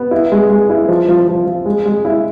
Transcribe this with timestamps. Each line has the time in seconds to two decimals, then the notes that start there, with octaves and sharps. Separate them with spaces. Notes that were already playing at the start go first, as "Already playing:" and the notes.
Already playing: B3
0.11 E4
0.32 G#3
0.50 G#3
0.70 E4
0.88 F3
1.09 F3
1.28 F3
1.46 F3
1.66 G#3
1.86 G#3
2.05 E4